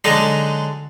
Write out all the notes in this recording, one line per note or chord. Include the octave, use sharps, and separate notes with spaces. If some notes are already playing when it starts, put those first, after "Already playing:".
D3 F#3 G#3 D4 D#4